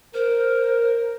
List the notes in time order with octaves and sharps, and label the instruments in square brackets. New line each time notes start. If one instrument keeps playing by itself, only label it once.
[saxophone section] A#4 [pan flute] C5